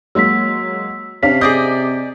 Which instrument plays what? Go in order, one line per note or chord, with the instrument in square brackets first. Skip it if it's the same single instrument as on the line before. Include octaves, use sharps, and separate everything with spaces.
[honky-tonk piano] F#3 G#3 A#3 [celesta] E6 B6
[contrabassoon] C3 [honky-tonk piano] C#4 D4 F5 [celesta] B6
[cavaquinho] G#4 D5 D#5 [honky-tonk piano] D6 G6